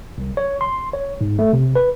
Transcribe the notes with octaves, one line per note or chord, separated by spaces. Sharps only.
C2
C#5
C6
C#5
G#2
A3
C3
B4